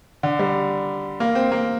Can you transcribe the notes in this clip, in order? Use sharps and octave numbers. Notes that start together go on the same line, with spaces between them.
D3
G3
A#3
C4
A#3